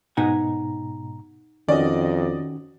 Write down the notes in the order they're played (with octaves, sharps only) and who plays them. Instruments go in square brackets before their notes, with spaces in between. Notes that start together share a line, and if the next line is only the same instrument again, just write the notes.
[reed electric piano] G#2 B2 A#5 [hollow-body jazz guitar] D#4 F#5 G#5
[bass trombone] F2 [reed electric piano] D#3 C#4 F#4 [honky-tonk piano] D5 D#5